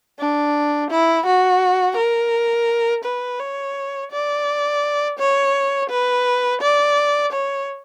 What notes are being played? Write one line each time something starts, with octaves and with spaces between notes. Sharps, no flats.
D4
E4
F#4
A#4
B4
C#5
D5
C#5
B4
D5
C#5